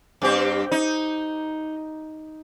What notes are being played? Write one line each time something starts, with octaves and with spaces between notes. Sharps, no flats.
G2 C4 G4
D#4